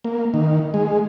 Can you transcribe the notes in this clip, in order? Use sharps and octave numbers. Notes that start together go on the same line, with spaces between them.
A#3
D#3
G#3